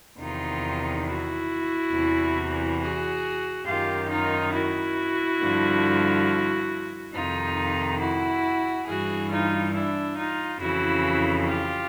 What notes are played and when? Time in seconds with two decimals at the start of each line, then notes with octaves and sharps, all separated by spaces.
0.20 E2 C3 D#3 D#4 F4
1.07 E4 F#4
1.93 E2 C3 E3
2.80 F#4 G#4
3.66 F#2 D#3 F4 G4
4.10 D#4 F4
4.53 E4 F#4
5.41 G2 D3 F3
7.13 F2 C3 D#3 D#4 F4
8.00 E4 F#4
8.86 G2 E3 F#4 G#4
9.30 D#4 F4
9.73 D4 E4
10.17 D#4 F4
10.60 F2 C#3 E3 E4 F#4
11.46 F4 G4